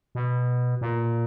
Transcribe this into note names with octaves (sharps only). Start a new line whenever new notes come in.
B2
A#2